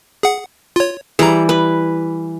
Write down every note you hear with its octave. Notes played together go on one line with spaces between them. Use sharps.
G#4 F#5
F4 C#5
E3 G3 G#4 A#5
B4